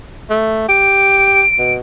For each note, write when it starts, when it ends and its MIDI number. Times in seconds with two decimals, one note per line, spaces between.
0.30 0.64 57
0.69 1.43 67
0.69 1.73 98
1.59 1.79 47